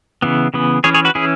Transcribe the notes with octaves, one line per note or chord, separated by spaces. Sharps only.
C#3 E3 B3
C#3 E3 B3
E3 C#4 G#4 C#5
G#4 C#5
F#4 B4
E3 C#4 E4 G#4